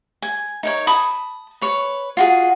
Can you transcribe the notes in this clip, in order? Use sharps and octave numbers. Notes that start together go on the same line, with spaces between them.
G#5
D#4 A#4 C#5
A5 B5 D#6
B4 C#5
F4 F#4 G#4